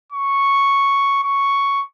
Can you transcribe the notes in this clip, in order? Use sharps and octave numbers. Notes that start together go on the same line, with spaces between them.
C#6
C#6